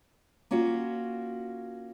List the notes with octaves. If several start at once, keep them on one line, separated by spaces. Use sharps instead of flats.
A#3 C#4 F4 F#4